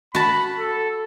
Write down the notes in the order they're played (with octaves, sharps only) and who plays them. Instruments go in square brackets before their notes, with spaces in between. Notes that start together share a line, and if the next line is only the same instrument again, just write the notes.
[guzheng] F#4 A5 [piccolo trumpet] B5
[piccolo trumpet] A4